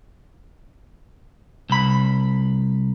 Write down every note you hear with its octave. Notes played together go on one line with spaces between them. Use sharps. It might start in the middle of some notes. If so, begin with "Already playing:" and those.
C2 B5